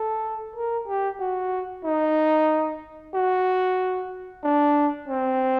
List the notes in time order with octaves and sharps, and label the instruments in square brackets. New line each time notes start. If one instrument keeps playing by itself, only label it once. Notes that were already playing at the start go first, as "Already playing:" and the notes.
Already playing: [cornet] A4
A#4
G4
F#4
D#4
F#4
D4
C4